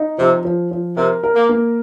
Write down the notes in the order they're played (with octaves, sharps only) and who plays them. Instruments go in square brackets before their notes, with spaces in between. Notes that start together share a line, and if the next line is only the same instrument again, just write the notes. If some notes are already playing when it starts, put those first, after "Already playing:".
Already playing: [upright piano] D#4
[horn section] C3 [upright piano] F3
[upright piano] F3
F3
[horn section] C3 [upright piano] A#4
[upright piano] A#4
[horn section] A#3
[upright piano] A#3